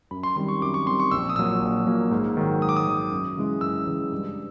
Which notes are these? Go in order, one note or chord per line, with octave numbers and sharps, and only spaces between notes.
F#2 B5
C6
D#3 G3 C4 C6
C#6
F#2 D6
C#6
D#3 G3 C4 C6
C#6
A#1 E6
D#6
A#2 F#3 A#3 E6
A#1
A#2 F#3 A#3
G#2
D#3 F#3
G#2 D#6
D6
D#6
D#3 F#3
F#2
C#3 E3 G#3
F#2 E6
C#3 E3 G#3
G2